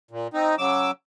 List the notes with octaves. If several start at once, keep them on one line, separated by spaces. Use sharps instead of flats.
A#2
C4 D#4
C#3 F#3 D6 E6